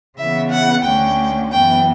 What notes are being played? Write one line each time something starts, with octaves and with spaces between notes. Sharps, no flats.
C#3 E3 B3 E5
F#5
D2 D3 A3 C#4 G5
F#2 E3 B3 G5